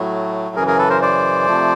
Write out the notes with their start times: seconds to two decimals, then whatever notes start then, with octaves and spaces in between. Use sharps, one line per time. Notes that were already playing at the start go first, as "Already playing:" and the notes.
Already playing: A2 F#3 A3
0.55 F#2 C#3 E3 G#4 A#4
0.67 G#4 A#4
0.78 A4 B4
0.90 A#4 C5
1.02 C5 D5
1.47 C3 F3 A3